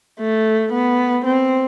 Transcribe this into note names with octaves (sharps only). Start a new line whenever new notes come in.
A3
B3
C4